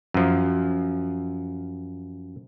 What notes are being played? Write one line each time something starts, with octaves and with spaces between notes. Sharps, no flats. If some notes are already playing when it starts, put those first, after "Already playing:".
F#2 F3